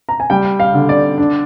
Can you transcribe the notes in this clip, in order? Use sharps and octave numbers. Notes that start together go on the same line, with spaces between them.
A#5
G#5
G3 G5
F5
D3
D5
D4